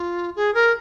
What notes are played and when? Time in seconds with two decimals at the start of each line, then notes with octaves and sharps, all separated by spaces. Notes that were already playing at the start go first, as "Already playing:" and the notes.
Already playing: F4
0.36 G#4
0.54 A#4